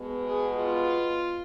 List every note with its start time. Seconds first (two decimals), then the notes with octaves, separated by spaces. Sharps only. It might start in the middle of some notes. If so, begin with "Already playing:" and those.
Already playing: B2 G#3 B3
0.24 G#4
0.57 F4